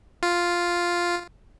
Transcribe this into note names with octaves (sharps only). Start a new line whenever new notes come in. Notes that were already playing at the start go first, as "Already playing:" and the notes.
F4